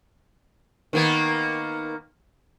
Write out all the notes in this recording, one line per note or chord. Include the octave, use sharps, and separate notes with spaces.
D#3 A#3 B3